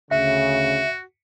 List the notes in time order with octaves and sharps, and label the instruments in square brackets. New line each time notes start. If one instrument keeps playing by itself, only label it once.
[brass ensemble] D2 C#3 [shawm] F#4 [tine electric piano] E5